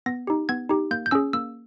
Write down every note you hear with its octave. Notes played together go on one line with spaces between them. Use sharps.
B3 A#6
D#4 G4
B3 G#6
D#4 G4
A#3 G6
G6
C#4 G#4 E6
A#3 E6